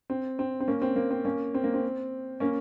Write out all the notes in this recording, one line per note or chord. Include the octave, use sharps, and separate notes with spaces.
C4
C4
C4
A#3 C#4
C4
A#3
C4
A#3 C#4
C4
A#3
C4
A#3 C#4